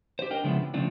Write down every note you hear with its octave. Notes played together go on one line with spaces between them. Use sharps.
G4 C5
D4 A#4 D#5 G5
C#3 F3 G#3 B3 D4 E4
C3
C#3 F3 A3 C4 D4 F4